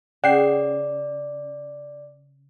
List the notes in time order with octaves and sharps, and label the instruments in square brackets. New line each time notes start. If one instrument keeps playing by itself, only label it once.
[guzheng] C#3 [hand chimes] D5 [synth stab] F#5 G5 C7